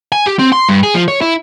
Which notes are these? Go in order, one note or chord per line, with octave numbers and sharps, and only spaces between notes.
G#5
G4
C4
C6
G2
G#4
F3
C#5
E4